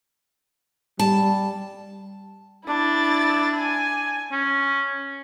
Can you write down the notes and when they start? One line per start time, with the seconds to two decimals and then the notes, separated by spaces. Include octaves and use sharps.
0.99 G3 A5
2.67 D4 E4 A6
3.58 G#5
4.32 C#4